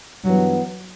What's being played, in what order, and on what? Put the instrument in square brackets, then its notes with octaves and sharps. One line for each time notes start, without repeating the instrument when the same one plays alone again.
[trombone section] G2 E3 B3 [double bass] F#3